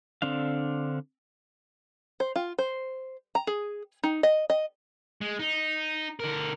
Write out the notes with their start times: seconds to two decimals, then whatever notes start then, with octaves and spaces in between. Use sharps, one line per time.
0.22 D3 C4 D4 F5
2.20 C5
2.36 F4
2.58 C5
3.35 A#5
3.47 G#4
4.04 D#4
4.23 D#5
4.50 D#5
5.21 G#3
5.39 D#4
6.20 D3 A#4